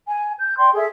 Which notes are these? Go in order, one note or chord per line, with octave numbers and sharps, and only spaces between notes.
G#5
G6
D5 G5 C6
G#4 A4 E5